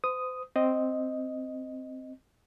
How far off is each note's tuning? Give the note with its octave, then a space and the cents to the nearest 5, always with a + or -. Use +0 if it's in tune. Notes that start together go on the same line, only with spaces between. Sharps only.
C5 -35 D#6 +0
C4 +0 D#5 +0